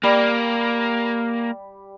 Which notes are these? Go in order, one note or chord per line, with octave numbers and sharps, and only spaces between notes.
G3 A#3